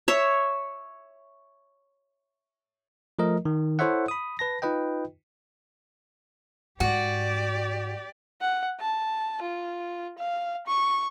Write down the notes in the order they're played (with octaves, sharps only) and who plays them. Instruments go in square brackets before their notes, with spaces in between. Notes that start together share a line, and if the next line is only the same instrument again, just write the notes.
[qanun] C#5 E5
[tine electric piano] F3 A3 A#4 D#5
D#3
E4 A4 C5 C#5 E5 F#5
B5 D#6
B4 A5 A#6
D#4 F4 B4 D#5 G5
[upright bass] G#2 [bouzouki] F#4 [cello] G4 D5
[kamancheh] F#5
A5
F4
F5
C#6